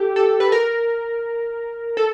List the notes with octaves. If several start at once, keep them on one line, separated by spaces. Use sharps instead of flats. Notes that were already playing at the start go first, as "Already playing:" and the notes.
Already playing: G4 A4
A4
B4
A#4
A4